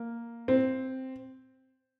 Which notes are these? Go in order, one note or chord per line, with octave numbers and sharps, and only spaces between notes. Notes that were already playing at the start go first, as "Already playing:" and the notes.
Already playing: A#3
C4